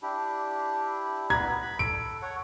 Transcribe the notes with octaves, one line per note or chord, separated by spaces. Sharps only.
D4 E4 G4
B3 B4 A#5 B5 G#6
B5
A4 D7
A4 C#5 F#5